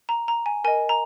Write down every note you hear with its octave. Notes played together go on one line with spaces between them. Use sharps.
A#5
A#5
G#5
A#4 D#5 G#5
A#5